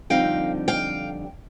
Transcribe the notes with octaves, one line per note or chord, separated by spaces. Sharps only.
F2 D3 G3 C4 D#4 F5 G5
F5 G5